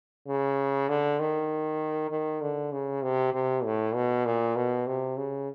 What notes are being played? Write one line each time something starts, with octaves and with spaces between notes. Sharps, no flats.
C#3
D3
D#3
D#3
D3
C#3
C3
C3
A2
B2
A#2
B2
C3
C#3